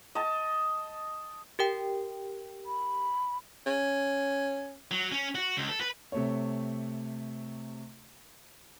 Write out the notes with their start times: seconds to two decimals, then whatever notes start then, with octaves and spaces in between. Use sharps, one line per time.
0.15 D#5 A5
1.59 G4 A#4 G5
2.66 B5
3.66 C#4
4.91 F#3
5.12 C#4
5.35 F#4
5.57 C#2
5.69 A4
5.81 B4
6.12 C3 A3 C#5